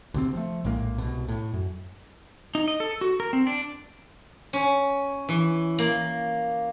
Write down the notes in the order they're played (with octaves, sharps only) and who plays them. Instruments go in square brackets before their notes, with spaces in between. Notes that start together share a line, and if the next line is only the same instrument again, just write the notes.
[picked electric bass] D2 C3 C4
F3 A3
A#1 A2 G#3 A#3
C2 B2
A2
F#2
[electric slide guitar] D#4
D#5
A4
F#4
A#4
C4
D4
[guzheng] C#4
E3
A#3